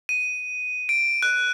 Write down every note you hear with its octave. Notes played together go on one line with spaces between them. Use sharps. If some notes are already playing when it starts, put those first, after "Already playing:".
D#7
D7
F#6